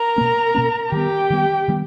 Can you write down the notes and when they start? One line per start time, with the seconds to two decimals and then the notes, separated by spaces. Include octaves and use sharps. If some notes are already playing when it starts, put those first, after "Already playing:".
Already playing: A#4 A#5
0.16 B2 A#3 C#4
0.55 B2 A#3 C#4
0.92 D#3 G3 B3 G4 G5
1.30 D#3 G3 B3
1.68 D#3 G3 B3